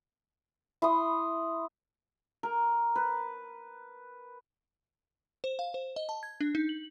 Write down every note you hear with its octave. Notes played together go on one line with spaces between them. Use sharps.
E4 C6 D#6
A#4
B4
C5
F5
C5
D#5
A5
G#6
D4
D#4
F#7